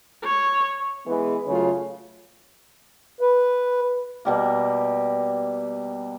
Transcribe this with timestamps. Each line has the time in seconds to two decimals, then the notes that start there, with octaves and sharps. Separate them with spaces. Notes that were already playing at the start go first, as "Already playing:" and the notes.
0.24 C#5
1.06 E3 G#3 B3 B4
1.47 F#2 C#3 F#3 A3 F4 C#5
3.21 B4
4.25 B2 G3 A#3